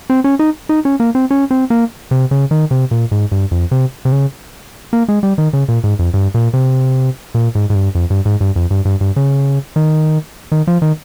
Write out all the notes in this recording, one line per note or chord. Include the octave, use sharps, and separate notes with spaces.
C4
C#4
D#4
D#4
C#4
A#3
C4
C#4
C4
A#3
C3
C#3
D#3
C3
A#2
G#2
G2
F2
C3
C3
C#3
A#3
G#3
G3
D#3
C#3
A#2
G#2
F2
G2
A#2
C3
A#2
G#2
G#2
G2
F2
G2
G#2
G2
F2
G2
G2
G2
C#3
D#3
D#3
F3
D#3